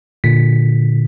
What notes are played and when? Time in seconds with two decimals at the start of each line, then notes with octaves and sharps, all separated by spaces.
0.24 A#2 D3 B6